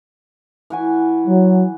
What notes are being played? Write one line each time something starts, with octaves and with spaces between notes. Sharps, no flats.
E3 F#4 G#5
F#3